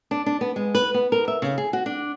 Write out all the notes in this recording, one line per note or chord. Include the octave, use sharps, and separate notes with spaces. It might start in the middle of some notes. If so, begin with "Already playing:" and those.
D4
D4
B3
G#3
B4
B3
A#4
E5
C#3
G#4
F#4
D4